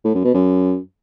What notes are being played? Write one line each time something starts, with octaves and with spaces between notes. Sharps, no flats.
A2
F#2
B2
F#2